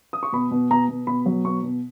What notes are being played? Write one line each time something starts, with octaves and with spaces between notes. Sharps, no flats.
D#6
C#6
B2 B5
B2
B2 A#5
B2
B2 B5
F#3
B2 C#6
B2